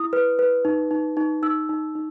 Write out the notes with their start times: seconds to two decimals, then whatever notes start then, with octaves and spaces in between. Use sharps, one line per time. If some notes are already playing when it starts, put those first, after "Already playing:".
Already playing: E4 D#6
0.13 B4
0.39 B4
0.65 D#4
0.91 D#4
1.17 D#4
1.43 D#4 E6
1.69 D#4
1.95 D#4